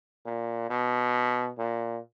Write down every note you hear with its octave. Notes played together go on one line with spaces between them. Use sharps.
A#2
B2
A#2